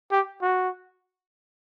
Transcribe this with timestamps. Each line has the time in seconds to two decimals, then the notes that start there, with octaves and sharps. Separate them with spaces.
0.12 G4
0.42 F#4